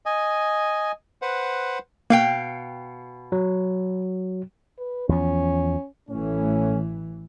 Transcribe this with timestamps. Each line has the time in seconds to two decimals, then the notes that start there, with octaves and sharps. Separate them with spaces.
0.06 D#5 G#5
1.22 B4 C5 F#5
2.10 B2 A#3 F5 G5
3.32 F#3
4.78 B4
5.09 E2 F3 C#4
6.10 A1 A2 E3 A3 C#4